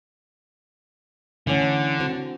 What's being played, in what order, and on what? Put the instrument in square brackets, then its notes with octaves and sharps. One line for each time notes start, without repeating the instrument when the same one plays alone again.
[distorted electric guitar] D3 [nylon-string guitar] E3 A3 C#4
[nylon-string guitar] C4 F#4